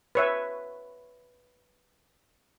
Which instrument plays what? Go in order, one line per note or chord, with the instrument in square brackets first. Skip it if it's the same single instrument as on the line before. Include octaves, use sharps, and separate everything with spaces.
[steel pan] B4 C#5 E5